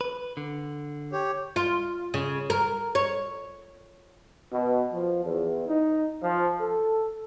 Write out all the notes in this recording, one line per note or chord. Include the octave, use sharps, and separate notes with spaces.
B4
D3
G4 C#5
F4
C#3
A#4
C#5
B2
F3
E2
D#4
F3
A4